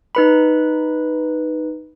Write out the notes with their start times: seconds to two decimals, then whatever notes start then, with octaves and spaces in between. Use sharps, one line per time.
0.15 D#4 B4 B5